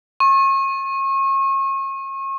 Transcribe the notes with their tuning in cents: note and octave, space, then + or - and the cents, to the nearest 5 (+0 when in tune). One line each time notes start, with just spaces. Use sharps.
C#6 -35